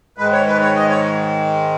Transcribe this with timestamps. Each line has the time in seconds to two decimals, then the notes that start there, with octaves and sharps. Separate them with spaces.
0.18 G#2 D#3 G#3 B4
0.32 C#5
0.48 B4
0.61 C#5
0.76 D#5
0.90 C#5